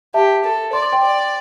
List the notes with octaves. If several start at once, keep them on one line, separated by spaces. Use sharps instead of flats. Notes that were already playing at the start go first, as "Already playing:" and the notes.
G4 E5 A5
A4
D5 C6
D6
G5 C6
D5